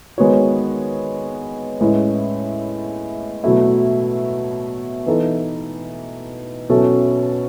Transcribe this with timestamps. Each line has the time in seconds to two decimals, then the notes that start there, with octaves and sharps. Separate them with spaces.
0.18 D#3 G#3 B3 F#4 C#5
1.80 A2 G#3 C#4 E4 B4
3.44 B2 F#3 A3 E4
5.06 E3 B3 D#4 A4
6.69 B2 F#3 C#4 E4 A4